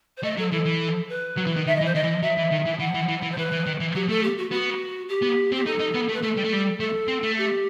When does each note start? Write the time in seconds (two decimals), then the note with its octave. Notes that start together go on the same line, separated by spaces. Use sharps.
0.17 C5
0.24 A3 D#5
0.38 F#3 A4
0.51 E3 A4
0.66 E3
1.09 B4
1.37 F#3
1.47 E3
1.56 D#3
1.67 D#3 E5
1.76 D#5
1.81 E3
1.85 C5
1.95 D#3 D#5
2.04 E3
2.23 F#3 E5
2.38 E3
2.52 D#3
2.66 E3
2.80 E3 F#5
2.95 E3
3.09 E3
3.23 E3
3.32 C5
3.37 E3 B4
3.52 E3
3.67 D#3
3.80 E3
3.95 F#3 G4
4.08 A3 A4
4.23 G4
4.37 F#4
4.51 B3 F#4
5.09 G4
5.23 B3
5.52 C4
5.55 G4
5.66 D#4 A4
5.80 D#4
5.94 B3
6.08 A3
6.14 B4
6.22 A3 A4
6.37 G3
6.44 A3
6.53 G3
6.80 A3 A4
7.08 C4
7.23 A3
7.38 G4